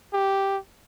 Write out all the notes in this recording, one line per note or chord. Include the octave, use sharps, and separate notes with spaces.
G4